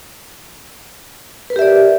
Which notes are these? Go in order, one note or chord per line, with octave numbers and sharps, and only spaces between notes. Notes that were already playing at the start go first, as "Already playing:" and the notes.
G4 A#4 B4 D5 E5